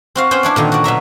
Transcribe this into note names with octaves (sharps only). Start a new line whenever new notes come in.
C4 F#4 F5
B3 C#4 C5 F#5 G5
D4 E4 D5
A#2 D3 D#3
F#4 D5
B2 F#3 E5 A#5